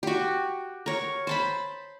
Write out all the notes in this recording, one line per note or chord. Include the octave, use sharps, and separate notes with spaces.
F#4 G4
A#4 C#5
C5 A5 B5